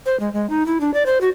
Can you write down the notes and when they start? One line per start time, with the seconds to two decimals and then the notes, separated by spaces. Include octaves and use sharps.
0.06 C5
0.20 G#3
0.33 G#3
0.50 D#4
0.66 E4
0.81 D4
0.94 D5
1.06 C5
1.21 F#4